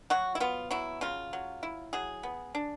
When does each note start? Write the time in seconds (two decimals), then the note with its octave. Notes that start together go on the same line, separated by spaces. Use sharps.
0.10 F#3 F#4
0.35 E4
0.40 B3 F4
0.71 F#3 E4
1.01 C#3 F4
1.33 F#3
1.63 E4
1.93 F#3 G#4
2.23 B3
2.55 D4